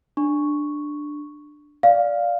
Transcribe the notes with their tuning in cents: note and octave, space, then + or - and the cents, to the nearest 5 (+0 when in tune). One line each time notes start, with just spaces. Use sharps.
D4 +10 C#6 +0
D5 -5 F5 +0